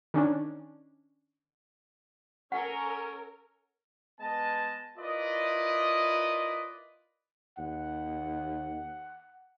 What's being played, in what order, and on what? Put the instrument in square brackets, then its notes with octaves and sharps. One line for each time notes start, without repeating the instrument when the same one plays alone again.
[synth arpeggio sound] D#3 C#4 D4
[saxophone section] C#4 [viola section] A4 A#4 [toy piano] F#5
[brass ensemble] G#3 B3 B4 D#5 A5
E4 F4 A#4 B4 D5 D#5
[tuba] D#2 [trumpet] F#5